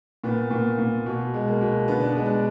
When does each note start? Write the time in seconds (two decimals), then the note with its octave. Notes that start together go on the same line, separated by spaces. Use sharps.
0.24 A#2 B3
0.51 A#2
0.78 A#2
1.06 B2
1.34 G#3
1.48 A#3
1.61 B2
1.88 D3 B3
2.01 D4
2.13 G#3 B3
2.26 D4